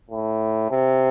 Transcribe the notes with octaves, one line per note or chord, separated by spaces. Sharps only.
A2
C3